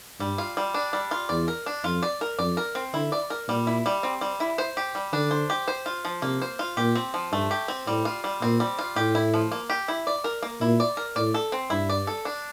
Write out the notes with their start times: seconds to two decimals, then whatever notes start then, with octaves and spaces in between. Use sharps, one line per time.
0.20 G2 G3
0.38 F4
0.57 G3
0.74 D4
0.93 G3
1.11 F4
1.29 E2 D5
1.48 A#4
1.66 D4
1.84 F2 F4
2.03 D5
2.21 A#4
2.38 F2 D5
2.57 A#4
2.75 C4
2.93 D3 E4
3.12 D5
3.30 A#4
3.48 A#2 G3
3.67 E4
3.86 G3
4.03 C4
4.21 G3
4.40 E4
4.58 C5
4.77 G4
4.95 G3
5.13 D3 D4
5.31 C5
5.50 G4
5.68 C5
5.86 F4
6.05 F3
6.22 C3 A#3
6.42 C5
6.59 F4
6.77 A#2 G4
6.95 C4
7.14 F3
7.32 G2 A3
7.51 G4
7.68 C4
7.86 A2 G3
8.05 F4
8.24 G3
8.41 A#2 C4
8.60 G3
8.79 F4
8.96 A2 G4
9.15 E4
9.34 F3
9.52 A#3
9.70 G4
9.88 E4
10.07 D5
10.24 A#4
10.42 A#3
10.61 A#2 E4
10.80 D5
10.97 A#4
11.16 A2 D5
11.34 A4
11.52 C4
11.70 G2 E4
11.89 D5
12.07 A4
12.25 D4